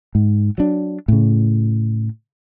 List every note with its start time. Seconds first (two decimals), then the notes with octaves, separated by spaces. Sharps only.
0.15 G#2
0.58 F#3 D4
1.08 A2 C#3